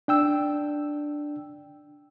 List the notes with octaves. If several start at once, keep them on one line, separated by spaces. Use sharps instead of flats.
D4 G5 E6